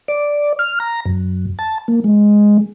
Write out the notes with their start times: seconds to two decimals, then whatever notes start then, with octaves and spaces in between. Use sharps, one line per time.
0.08 D5
0.59 F6
0.80 A#5
1.06 F#2
1.59 A5
1.88 A#3
2.04 G#3